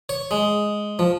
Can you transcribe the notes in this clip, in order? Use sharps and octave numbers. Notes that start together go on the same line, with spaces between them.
C#5
G#3
F3